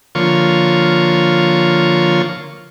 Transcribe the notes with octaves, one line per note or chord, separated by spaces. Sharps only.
D3 F3 A#3 F4 C#5 C#6